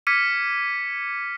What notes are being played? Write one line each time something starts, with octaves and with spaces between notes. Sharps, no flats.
D6 F6 G#6 B6 C#7 D#7